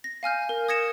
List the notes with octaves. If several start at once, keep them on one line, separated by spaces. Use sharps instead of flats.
A#6
F5 G#5 F6 G6
A#4
D#6 G#6 A#6 C#7 E7